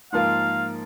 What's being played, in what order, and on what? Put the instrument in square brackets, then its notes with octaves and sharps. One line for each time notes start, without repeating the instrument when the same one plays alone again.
[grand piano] G#2 F3 A#3 F4 A#4 [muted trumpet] F5